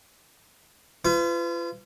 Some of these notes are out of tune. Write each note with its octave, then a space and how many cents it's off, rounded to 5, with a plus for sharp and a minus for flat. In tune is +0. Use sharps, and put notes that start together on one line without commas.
F4 -35 B4 +35